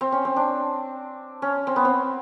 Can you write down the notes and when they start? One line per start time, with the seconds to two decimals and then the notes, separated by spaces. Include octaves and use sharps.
0.01 C4
0.12 C#4
0.25 C4
0.36 D4
1.42 C#4
1.67 C4
1.76 B3
1.85 C4